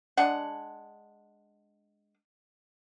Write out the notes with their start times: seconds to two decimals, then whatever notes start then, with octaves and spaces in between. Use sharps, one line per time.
0.17 G#3 D4 F#5